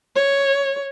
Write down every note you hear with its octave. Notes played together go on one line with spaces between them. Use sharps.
C#5